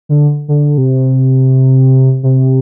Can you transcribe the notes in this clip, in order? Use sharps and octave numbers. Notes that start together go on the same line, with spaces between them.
D3
D3
C3
C3